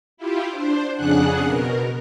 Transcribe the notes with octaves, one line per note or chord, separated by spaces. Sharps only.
E4 F4 G4
D4 C5
F2 C#3 D4 G#4 F#5 F#6
B2 A#4